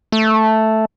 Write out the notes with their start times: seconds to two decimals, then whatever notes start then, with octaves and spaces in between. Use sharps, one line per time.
0.12 A3